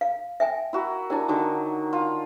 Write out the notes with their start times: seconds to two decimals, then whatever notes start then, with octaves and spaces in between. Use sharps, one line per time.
0.01 F5
0.40 E5 G5 G#5
0.73 E4 F#4 A#4
1.10 D4 E4 G4 A#4 G#5
1.28 D3 D#3 F#3
1.93 F4